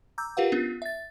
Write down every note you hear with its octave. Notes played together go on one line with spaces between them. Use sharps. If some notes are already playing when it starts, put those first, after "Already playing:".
A#5 D6 E6 G6
F4 G4 A#4 B4 F5 F#5
B3 C#4 D4 F4
E5 A6